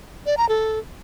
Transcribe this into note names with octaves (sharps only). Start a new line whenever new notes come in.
D5
A#5
A4